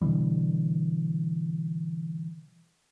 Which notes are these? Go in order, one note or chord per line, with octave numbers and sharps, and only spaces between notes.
B2 D3 E3 G3